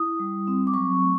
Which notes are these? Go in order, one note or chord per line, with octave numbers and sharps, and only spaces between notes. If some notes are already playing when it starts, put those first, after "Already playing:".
Already playing: E4 D#6
G3
C4
D6
F#3 C#6
A3